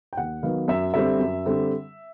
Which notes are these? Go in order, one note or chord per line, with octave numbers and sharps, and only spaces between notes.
G5
D#2 F#5
D#3 F#3 B3 F5
F#2 E5
D3 G3 C4 E5
F#2
D3 G3 C4